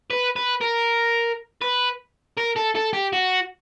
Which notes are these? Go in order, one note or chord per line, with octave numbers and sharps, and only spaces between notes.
B4
B4
A#4
B4
A#4
A4
A4
G4
F#4